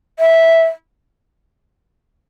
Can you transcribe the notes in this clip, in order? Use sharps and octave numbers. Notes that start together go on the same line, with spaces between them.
E5